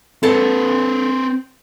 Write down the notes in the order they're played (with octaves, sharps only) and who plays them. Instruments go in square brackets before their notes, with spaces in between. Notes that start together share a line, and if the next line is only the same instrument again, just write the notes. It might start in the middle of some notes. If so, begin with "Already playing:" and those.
[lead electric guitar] C4 B4 [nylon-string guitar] A4 A5